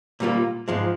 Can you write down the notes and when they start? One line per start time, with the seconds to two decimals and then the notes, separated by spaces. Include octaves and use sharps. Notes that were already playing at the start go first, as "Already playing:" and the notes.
0.20 A#2 G3 A#3 F4
0.68 G#2 F3 G#3